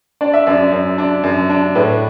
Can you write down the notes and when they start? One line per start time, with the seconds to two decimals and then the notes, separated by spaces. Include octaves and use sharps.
0.21 D4 D5
0.34 E5
0.46 F#2 D5
0.72 F#2
0.98 D4
1.23 F#2
1.49 D4
1.75 A2 B4